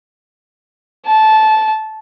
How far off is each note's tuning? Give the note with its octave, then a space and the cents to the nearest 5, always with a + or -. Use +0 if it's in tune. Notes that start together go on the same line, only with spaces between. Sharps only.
A5 -15